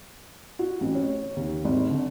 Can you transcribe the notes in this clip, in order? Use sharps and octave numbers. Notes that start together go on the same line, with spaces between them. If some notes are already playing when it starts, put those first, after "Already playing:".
F#4
A1
C#5
D#2
G#1
D3